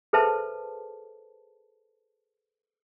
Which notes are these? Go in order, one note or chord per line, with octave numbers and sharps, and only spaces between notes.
G#4 A4 B4 C5 E5 A5